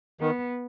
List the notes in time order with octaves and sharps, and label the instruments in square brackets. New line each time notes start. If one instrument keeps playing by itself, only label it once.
[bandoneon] D#3 [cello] B3